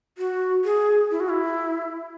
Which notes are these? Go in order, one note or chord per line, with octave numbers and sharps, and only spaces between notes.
F#4
G#4
E4
F#4
E4